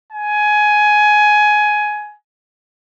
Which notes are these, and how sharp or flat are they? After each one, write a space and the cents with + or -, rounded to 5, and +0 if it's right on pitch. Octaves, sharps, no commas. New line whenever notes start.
G#5 +15